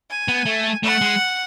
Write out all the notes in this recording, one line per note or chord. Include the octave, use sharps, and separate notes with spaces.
G#5
B3
A3
A3 F#5
G#3